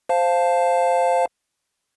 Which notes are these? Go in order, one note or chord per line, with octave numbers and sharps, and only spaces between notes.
C5 F5 A5